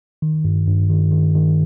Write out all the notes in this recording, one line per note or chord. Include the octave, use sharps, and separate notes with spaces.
D#3
G2
G2
D#3
D#3
D#3